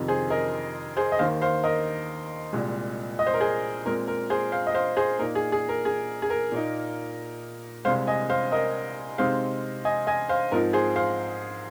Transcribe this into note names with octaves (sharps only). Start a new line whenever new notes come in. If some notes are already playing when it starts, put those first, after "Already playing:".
Already playing: F2 C3 D#3
G#4 C5
A#4 D#5
G#4 C5
D#5
D#2 D#3 A#3 C5 F5
C5 F5
A#4 D#5
C2 A#2 G#3
D#5
C5
A#4
G#4 C5
A#2 G#3 C4 A#4
A#4
G#4 C5
C5 F5
D#5
C5 F5
G#4 C5
A#2 A#3 D#4 A#4
G#4
G#4
A#4
G#4
G#4
A#4
A#2 A#3 D#4
C2 C3 G#3 C5 F5
D#5 G#5
C5 F5
A#4 D#5
C3 G#3 C4 D#4 C5 F5
D#5 G#5
D#5 G#5
C5 F5
G#2 F3 C4 D#4 A#4
G#4 C5
C5 F5